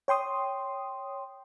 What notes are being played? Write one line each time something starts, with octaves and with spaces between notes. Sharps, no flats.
C#5 G5 C6 D#6